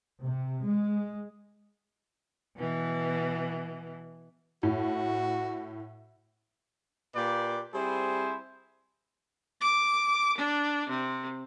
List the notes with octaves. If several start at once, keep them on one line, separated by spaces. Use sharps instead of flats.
C3
G#3
B2 E3
A2 F#4
A#2 A#3 G4 B4 D5
G3 C4 E4 G#4 C5
D6
D4
C3